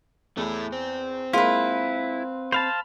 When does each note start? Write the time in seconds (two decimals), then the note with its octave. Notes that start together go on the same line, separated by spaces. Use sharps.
0.37 E2 A3 E4
0.72 C4
1.33 G#3 A#3 E4 F4 B4
2.52 C5 F5 A5 B5 F7